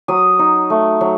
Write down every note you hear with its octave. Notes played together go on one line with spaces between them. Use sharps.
F#3 D#6
D#4
A3
F#3